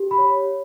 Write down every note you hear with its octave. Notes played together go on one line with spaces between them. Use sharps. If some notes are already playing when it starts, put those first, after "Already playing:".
Already playing: G4
B5
C#5